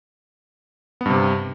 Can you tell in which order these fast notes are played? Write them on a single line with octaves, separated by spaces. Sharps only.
B3 G2 C3